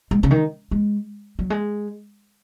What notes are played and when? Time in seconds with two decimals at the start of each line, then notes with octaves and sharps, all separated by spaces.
0.11 G#3
0.23 C#3
0.31 D#3
0.71 G#3
1.39 F#3
1.50 G#3